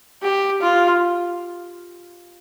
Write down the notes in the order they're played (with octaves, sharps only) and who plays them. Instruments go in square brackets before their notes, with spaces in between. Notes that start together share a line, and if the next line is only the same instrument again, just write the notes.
[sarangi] G4
F4